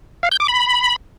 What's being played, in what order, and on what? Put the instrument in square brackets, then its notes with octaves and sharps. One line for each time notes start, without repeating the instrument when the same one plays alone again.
[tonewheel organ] F5
G6
D6
B5